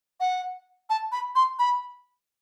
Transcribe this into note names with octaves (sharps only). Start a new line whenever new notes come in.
F#5
A5
B5
C6
B5